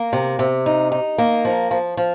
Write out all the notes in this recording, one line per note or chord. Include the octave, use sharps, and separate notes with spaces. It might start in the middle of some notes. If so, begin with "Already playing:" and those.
Already playing: A#3
C3
C3
D#4
D#4
A#3
F3
F3
F3